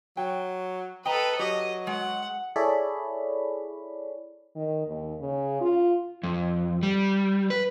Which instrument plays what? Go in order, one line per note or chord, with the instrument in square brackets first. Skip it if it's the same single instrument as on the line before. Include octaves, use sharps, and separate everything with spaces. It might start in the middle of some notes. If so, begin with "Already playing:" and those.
[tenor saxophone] F#3 [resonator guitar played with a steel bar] G5
[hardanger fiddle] A4 B4 [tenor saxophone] D#5 [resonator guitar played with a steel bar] G5 A#5
[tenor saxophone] F#3 [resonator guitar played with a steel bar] G4 [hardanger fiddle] D#5
[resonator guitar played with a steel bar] G#3 [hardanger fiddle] F#5
[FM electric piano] E4 G#4 A4 C#5 D5 B5
[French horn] D#3
D#2
C#3
F4
[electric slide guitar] F2
G3
B4